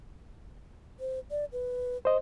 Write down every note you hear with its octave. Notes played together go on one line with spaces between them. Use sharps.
C5
D5
B4
C5 D#5